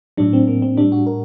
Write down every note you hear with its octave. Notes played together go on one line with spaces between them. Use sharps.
A2 F#3 D4
C4
A#3
C4
A2 G3 D4
F#4
A#4